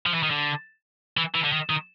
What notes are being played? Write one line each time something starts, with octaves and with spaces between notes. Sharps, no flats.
F3
E3
D#3
D3
E3
E3
D3
D#3
D#3